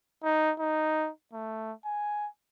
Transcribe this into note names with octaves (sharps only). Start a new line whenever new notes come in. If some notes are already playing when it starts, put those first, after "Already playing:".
D#4
D#4
A3
G#5